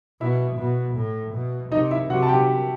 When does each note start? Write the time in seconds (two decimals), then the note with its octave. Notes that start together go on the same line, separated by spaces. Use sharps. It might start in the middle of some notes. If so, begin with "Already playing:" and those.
0.21 B2 E4 E5
0.58 B2
0.96 A2
1.34 B2
1.72 C3 D#4 D#5
1.91 E4 E5
2.10 C3 F#4 F#5
2.22 A5
2.29 G4 G5